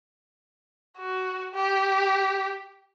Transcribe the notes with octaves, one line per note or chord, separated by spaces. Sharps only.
F#4
G4